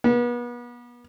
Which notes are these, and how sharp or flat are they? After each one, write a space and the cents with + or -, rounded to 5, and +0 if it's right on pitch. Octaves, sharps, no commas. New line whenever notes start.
B3 -35